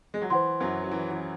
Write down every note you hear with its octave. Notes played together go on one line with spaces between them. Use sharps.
G#3
F#3
E3 C5 F#5 C6
F#2 F#3
F#3
E3
E3